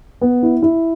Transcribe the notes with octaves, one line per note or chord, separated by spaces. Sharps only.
B3
E4
E4